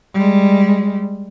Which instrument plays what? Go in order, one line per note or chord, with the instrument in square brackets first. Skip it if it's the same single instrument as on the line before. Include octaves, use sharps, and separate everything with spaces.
[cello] G3 G#3